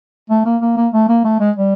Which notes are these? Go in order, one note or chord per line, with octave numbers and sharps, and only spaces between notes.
A3
A#3
A#3
A#3
A3
A#3
A3
G#3
G3